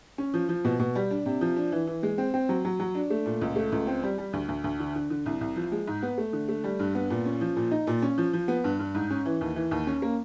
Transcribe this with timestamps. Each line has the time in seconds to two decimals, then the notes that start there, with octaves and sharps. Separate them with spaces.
0.18 C#4
0.34 F3
0.49 F3
0.65 B2
0.79 B2
0.95 G3
1.11 D4
1.26 C3
1.41 F3
1.57 D4
1.72 E3
1.87 E3
2.03 G#3
2.18 C4
2.34 C4
2.49 F#3
2.65 F#3
2.80 F#3
2.95 D4
3.10 A3
3.26 A#2
3.41 C#2
3.56 A3
3.72 C#2
3.87 C4
4.03 G3
4.18 G3
4.33 D2
4.49 D2
4.64 D2
4.79 D3
4.95 D3
5.10 D3
5.26 C2
5.41 C2
5.56 F3
5.72 G#3
5.87 G#2
6.03 B3
6.18 A3
6.33 D3
6.49 A3
6.64 G3
6.79 G2
6.95 B3
7.10 A#2
7.26 C#4
7.41 F3
7.56 A#2
7.71 D#4
7.87 A#2
8.02 C#4
8.18 F3
8.33 F3
8.48 B3
8.64 G2
8.79 G2
8.95 G#2
9.10 C#4
9.25 E3
9.41 D#2
9.56 E3
9.71 D#2
9.87 C#4
10.02 A#3